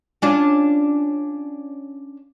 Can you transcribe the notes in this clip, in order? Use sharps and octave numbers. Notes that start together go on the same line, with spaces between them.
C#4 D4 F4